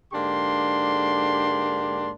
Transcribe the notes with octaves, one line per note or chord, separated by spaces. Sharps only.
G#2 D3 A#3 D4 G4 C6